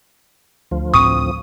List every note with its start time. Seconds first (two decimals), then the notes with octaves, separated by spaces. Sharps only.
0.71 D2 F3
0.94 A1 A2 C4 C#6 D#6